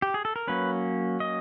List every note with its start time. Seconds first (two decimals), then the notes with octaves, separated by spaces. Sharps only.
0.02 G4
0.14 G#4
0.25 A4
0.36 A#4
0.48 F#3 A#3 C#4 B4
1.20 D#5